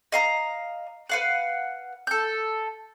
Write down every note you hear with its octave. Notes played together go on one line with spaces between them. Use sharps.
D#5 F5 A#5
B4 F5 F#5
A4 G6